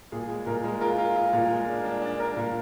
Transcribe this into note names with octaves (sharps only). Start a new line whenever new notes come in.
A#2 G#4
G#3
A#2 A#4
G#3
F4 A#4
F4
F4
A#2
G#3
D4
D4
D4
D4 A#4
A#2